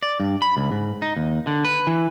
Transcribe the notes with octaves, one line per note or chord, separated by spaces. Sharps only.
D5
G2
B5
C#2
G#2
D#4
D#2
D3
B4
E3